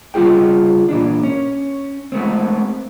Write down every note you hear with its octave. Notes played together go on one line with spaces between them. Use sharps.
C#3 G3 C#4 F4 G#4 G5
A#2 E3 D4
C#4
G#3 A3 B3 C4